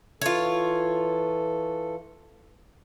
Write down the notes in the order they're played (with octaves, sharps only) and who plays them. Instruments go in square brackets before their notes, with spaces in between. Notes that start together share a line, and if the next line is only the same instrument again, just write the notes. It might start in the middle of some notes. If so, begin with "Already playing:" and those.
[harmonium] E3 A4 [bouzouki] F4 C#5